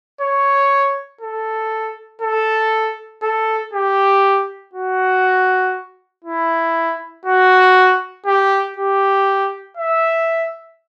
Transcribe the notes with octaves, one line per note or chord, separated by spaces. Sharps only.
C#5
A4
A4
A4
G4
F#4
E4
F#4
G4
G4
E5